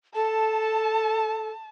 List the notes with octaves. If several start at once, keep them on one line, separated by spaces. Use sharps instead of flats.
A4 A5